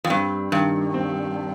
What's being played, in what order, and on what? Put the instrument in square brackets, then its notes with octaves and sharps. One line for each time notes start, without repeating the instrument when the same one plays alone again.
[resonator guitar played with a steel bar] F2
[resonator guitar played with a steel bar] G2 [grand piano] C4
[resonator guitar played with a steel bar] G2 [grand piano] D#3
[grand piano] C4